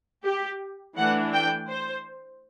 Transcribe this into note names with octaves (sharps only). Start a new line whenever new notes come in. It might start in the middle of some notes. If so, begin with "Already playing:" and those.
G4
E3 A3 D4 F#5
G5
C5